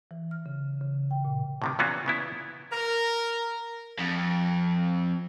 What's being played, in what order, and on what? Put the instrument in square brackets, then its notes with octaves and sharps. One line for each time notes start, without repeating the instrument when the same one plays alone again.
[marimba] E3
F6
C#3
C#3
G5
A#2
[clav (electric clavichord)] A2 C3 D#3
A#2 E3 B3 C#4 F4 F#4
C#3 B3 E4
[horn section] A#4
[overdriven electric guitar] F2